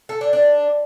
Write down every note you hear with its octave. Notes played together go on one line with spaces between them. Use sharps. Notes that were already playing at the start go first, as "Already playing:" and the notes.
A4
D4
D4